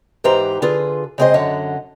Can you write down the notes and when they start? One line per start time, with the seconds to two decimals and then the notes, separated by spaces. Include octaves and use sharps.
0.24 G#2 E3 G4 B4 C5 A#5
0.62 D3 F4 G#4 B4
1.18 C#3 G#3 C4 G#4 C5 D#5
1.34 F#2 D3 C#5 D#5 F#5